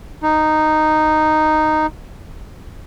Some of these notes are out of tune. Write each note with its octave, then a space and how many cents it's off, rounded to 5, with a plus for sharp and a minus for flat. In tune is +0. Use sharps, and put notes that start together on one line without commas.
D#4 -5